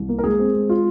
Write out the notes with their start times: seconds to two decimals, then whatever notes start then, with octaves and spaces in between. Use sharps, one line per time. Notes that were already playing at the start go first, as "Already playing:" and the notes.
Already playing: C2
0.09 A#3
0.19 A#4
0.24 G#3 G#4
0.39 C4
0.54 G#3
0.70 F4